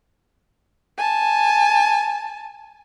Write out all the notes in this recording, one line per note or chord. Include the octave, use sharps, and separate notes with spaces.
G#5 A5